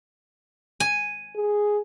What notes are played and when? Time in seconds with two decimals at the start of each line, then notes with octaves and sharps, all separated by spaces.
0.80 G#5
1.36 G#4